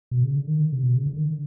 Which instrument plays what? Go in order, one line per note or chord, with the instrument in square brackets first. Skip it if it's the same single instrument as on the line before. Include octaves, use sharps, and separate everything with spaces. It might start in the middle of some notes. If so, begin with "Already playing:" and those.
[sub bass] B2
C#3
D3
D#3
D3
C3
B2
C#3
D3
D#3
D3